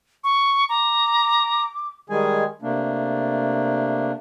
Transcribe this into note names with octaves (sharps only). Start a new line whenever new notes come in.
C#6
A#5 D6
D#3 G3 G#3 G#4 G#5
C3 A3 A#3 D4